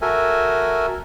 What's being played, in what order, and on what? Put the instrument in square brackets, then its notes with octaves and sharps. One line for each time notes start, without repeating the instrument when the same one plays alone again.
[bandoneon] F#4 A4 A#4 E5 G#5